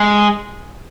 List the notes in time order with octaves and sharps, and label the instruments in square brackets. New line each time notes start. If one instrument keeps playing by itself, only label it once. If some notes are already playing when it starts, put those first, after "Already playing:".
Already playing: [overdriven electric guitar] G#3